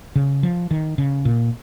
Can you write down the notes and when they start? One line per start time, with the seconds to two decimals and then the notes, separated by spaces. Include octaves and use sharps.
0.16 C#3
0.43 F3
0.71 D#3
0.98 C#3
1.25 A#2